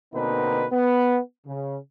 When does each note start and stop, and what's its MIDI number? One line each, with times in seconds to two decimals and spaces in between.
0.14 0.66 47
0.14 0.66 50
0.14 0.66 58
0.14 0.66 60
0.14 0.66 63
0.14 0.66 71
0.72 1.19 59
1.46 1.77 49